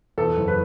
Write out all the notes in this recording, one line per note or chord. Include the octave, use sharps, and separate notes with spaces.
E2 A4
F#1
B4